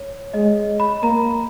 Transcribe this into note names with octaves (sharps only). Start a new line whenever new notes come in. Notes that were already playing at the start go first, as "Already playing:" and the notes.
Already playing: C#5
G#3 D#5
B5
A#3 A#5